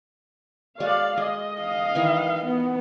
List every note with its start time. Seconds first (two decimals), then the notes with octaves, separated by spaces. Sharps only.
0.80 G#3 F#4 D5 F5
1.17 G#3 D#5
1.62 F5
1.95 D#3 E3 G#5
2.45 B3